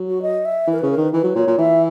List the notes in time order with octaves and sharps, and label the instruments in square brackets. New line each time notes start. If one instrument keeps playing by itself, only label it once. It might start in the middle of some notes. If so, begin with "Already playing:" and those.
Already playing: [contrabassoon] F#3
[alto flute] F#4
D#5
E5
[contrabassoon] E3
[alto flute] A#4
[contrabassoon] C#3 [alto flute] B4
[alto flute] A#4
[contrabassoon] D#3 [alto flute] B4
[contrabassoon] E3 [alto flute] B4
[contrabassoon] F#3
[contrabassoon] A#2 [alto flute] C#5
[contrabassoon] A#2
[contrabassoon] E3 [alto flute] E5